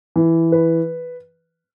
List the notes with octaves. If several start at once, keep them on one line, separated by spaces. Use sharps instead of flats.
E3
B4